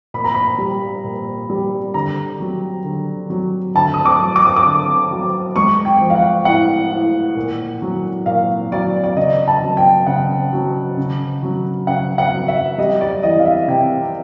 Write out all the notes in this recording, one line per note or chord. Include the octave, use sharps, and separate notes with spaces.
A#2 B5
A#5
B5
G3
A#2
G3
D3 A#5
F#3
D3
F#3
D3 A5
D#6
D6
F#3
D6
D#6
D6
D3
F#3
G#3 C#6
G5
F3
F5
F#5
A2 F#5
A2
A#2
F#3
A#2 F5
F#3 D5
D5
C#3 D#5
A5
F#3
G5
C#3 F#5
F#3
C#3
F#3
C#3 F#5
F#5
F#3
E5
G3 D#5
D5
E3 D#5
F5
E5
C3 G5